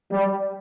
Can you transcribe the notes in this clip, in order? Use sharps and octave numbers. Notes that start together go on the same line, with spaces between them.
G3